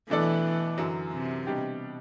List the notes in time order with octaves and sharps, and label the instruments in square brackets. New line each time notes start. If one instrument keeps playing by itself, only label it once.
[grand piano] B2 A3 D4 A4 D5 [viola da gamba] E3
[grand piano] F#2 D3 F#3
[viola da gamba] C3
[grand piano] B2 G3 D4 G4